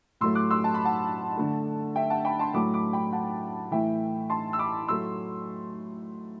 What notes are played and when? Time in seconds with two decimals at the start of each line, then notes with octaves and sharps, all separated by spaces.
0.21 A2 F#3 A3 C6 E6
0.35 D6 F#6
0.50 C6 E6
0.64 A5
0.74 B5
0.85 F#5 A5
1.37 D3 A3
1.96 E5 G5
2.10 F#5 A5
2.25 G5 B5
2.39 A5 C6
2.54 A2 F#3 A3 B5 D6
2.74 B5 D6
2.93 G5 B5
3.12 F#5 A5
3.71 A2 E3 A3 E5 G5
4.30 A5 C6
4.53 E6
4.59 B5 D6
4.88 A2 F#3 A3 C6 E6